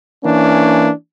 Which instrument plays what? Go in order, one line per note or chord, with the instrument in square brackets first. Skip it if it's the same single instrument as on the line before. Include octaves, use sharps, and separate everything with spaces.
[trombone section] E3 A#3 C#4 D4